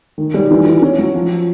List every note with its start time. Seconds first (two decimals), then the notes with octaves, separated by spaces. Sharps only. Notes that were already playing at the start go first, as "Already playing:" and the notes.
0.18 D#3
0.34 G3
0.51 E3
0.66 E3
0.82 C#4
0.98 F#3
1.15 F3